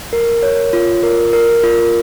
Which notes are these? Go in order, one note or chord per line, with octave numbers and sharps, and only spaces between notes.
A#4
C#5
F4
A#4
A#4
F4